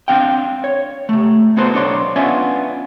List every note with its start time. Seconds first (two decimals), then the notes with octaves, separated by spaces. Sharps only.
0.08 C4 D4 F5 G5
0.64 C#5
1.09 C3 A3
1.57 A#3 B3 F#4 A4 B4 C5
1.74 B1 D4 C#5 D5 C6
2.16 B3 C#4 D4 F4 E5 G#5